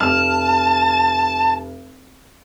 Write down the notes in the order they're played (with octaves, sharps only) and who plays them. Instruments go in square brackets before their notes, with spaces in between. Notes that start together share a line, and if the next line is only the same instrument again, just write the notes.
[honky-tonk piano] F1 F6 [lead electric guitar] A5